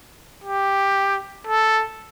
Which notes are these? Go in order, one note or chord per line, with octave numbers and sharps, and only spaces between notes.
G4
A4